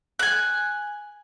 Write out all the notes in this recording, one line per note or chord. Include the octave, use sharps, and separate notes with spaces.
G#5 F#6